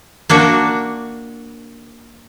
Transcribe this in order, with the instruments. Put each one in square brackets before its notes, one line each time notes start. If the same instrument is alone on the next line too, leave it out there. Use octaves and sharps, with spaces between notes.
[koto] A#3 D4 F#4